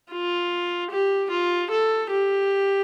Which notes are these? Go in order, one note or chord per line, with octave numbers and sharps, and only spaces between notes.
F4
G4
F4
A4
G4